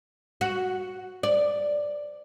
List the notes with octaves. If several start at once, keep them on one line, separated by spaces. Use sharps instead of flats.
F#4
D5